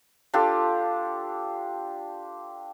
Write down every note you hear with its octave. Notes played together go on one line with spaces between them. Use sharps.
D4 F4 G4 A4